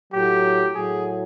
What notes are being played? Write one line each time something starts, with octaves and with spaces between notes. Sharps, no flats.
A2 F#3 G4
A2 F#3 G#4